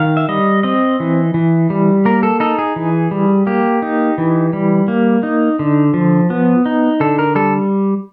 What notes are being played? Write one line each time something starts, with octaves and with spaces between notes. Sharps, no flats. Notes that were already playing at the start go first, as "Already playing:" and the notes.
Already playing: D#3 F5
E5
G3 D#5
C4 D#5
E3
E3
G3
A#3 A#4
A4
D#4 A4
G#4
E3
G3
A#3 G4
D#4
E3
G3
A#3
D#4
D3
F3
B3
D#4
D3 A4
A#4
G3 A4